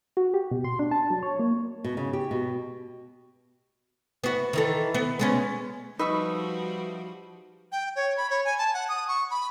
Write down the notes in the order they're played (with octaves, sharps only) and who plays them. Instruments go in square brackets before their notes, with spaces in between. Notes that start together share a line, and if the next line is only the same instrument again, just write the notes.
[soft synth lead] F#4
G4
B2
C6
D4
A5
F#3
C#5
A#3
[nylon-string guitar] B2
C#3
G4
B2
[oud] B3 F#4
D#3 E3 A4
B3
G#3 B3 C#4
[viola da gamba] F3 G3 F#4 [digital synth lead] D#4 [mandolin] B4 E5 C#6
[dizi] G5
C#5
B5
C#5
G#5
A5
F#5
D#6
C#6
B5